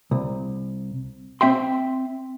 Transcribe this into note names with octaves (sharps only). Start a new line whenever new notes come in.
C2
C4 E5 G5 C6